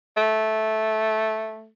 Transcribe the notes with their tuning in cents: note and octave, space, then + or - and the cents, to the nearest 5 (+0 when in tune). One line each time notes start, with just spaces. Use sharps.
A3 -10